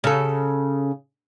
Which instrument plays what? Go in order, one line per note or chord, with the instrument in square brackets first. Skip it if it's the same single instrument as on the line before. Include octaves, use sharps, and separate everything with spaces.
[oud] C#3 A4